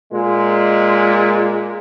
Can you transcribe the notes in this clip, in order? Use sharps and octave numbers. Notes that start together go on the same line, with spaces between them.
A#2 G#3